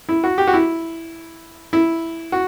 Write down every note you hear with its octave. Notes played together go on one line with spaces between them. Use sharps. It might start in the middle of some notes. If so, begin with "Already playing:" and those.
E4
F#4
G4
F#4
E4
E4
F#4